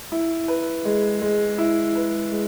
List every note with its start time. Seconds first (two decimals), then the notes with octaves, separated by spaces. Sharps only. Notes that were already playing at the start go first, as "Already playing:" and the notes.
0.12 E4
0.48 B4
0.85 G#3
1.22 G#3
1.58 E4
1.96 B4
2.32 G#3